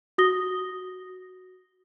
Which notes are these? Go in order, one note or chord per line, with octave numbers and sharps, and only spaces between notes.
F#4 D#6 A#6 G7